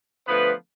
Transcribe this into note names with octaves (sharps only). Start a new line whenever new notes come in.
D3 F3 A3 B3 B4